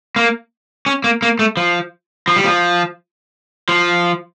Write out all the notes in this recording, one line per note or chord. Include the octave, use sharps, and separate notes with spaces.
A#3
C#4
A#3
A#3
A3
F3
F3
G3
F3
F3